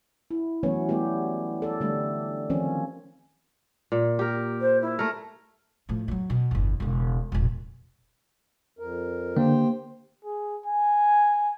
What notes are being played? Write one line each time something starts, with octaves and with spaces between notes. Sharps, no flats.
E4
E3 F#3 A3 B3 C#4 C#5
G3 A3 B3 G4
A4 D5
D3 G3 A3
D#3 F3 C4 C#4
A#2
G4 A#4
C5
E4
A3 A#4
A2 F3
E3 F#3
B2
G1 E2
E1 C#3
E1 A#1
F2 A#4
D3 A#3 G4 C5 G5
G#4
G#5